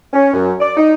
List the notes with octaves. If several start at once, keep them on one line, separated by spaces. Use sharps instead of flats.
C#4
F#2
D5
D#4